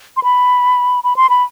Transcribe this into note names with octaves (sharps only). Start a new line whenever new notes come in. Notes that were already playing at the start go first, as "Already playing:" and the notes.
C6
B5
B5
C6
B5